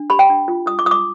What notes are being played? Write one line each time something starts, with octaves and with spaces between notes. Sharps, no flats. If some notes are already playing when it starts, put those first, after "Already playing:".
Already playing: D4
G4 B5
G5
D4
F4
F4 D#6
D6
F4 D#6
D6